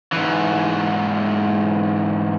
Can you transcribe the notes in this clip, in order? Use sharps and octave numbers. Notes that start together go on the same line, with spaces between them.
G#2 E3